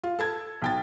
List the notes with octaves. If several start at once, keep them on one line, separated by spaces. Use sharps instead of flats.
F4
A4 A5 G#6
B1 G5 A6